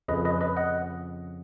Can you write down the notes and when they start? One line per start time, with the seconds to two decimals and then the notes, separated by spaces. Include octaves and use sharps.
0.08 F2 C#3 B4 D#5
0.25 B4 D#5
0.41 B4 D#5
0.57 D#5 F#5